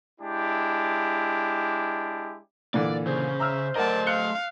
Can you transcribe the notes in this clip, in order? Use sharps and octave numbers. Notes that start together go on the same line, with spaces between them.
G#3 D4 E4 G4
A#2 D3 E3 D5
C#3 C5
E5 A#5 E6 F6
A3 A#4 D5 D#5 F#5 A5
F5 F#6 C#7 G7